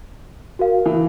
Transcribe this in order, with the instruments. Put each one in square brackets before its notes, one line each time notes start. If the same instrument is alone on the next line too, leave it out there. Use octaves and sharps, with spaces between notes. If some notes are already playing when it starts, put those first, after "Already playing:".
[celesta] F#4 A#4 F5
[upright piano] E3